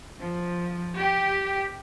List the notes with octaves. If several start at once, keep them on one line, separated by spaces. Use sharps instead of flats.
F3
G4